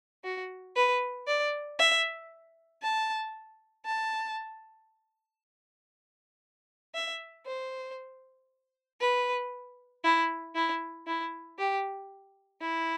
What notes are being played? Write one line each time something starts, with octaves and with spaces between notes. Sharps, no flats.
F#4
B4
D5
E5
A5
A5
E5
C5
B4
E4
E4
E4
G4
E4